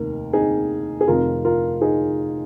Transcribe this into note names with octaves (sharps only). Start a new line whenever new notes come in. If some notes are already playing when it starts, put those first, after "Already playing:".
Already playing: F1 D#2 D#3 A#4
D#4 G#4
G#4
F1 F2 D#3 F4 A#4
F4 A#4
D#4 G#4